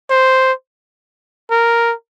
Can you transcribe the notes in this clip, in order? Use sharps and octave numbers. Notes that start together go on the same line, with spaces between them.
C5
A#4